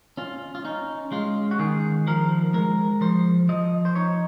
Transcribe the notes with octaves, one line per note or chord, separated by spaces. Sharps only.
C#4 F4
F4
C#4 D#4
G#3 F4
F#4
D#3 G#4
F3 A#4
G#3 A#4
F3 C5
F3 D#5
C5
D#4 C#5